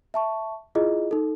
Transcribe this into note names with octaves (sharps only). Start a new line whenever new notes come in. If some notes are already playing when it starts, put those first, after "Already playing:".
E5 A5 C#6
E4 F4 G#4 D#5
D#4 A4